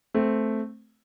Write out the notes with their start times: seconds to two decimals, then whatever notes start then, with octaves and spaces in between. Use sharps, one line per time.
0.14 A3 C4